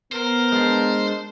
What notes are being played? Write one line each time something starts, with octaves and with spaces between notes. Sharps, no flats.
B3 A#4 C5
G#3 D4